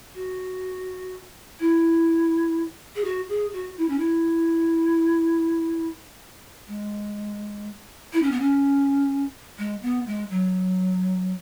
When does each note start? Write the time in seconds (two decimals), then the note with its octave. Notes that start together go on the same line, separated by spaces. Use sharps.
0.15 F#4
1.60 E4
2.96 G#4
3.04 F#4
3.29 G#4
3.53 F#4
3.77 E4
3.89 C#4
3.99 E4
6.68 G#3
8.13 E4
8.22 C#4
8.31 B3
8.40 C#4
9.58 G#3
9.83 B3
10.07 G#3
10.31 F#3